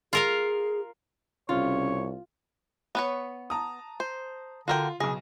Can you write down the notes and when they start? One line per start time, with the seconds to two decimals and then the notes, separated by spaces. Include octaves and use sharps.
0.13 F4 G#4 A#4 F5
1.49 C2 C#3 F4 C#5
2.95 B3 B4 C#5
3.50 A5 A#5 D#6
4.00 C5
4.68 D3 F4 F#4 A#4 G5
5.00 B1 C#3 G#4 A#6